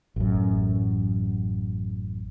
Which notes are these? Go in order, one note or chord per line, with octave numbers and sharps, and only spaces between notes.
A1 F#2